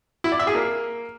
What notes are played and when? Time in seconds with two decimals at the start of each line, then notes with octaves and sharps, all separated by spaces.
0.24 E4
0.32 D5
0.39 E5
0.47 G#4
0.55 A#3